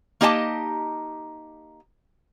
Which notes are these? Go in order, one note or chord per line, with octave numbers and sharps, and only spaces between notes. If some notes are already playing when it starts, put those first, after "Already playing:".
A#3 D#4 G4 D#5 G5 A5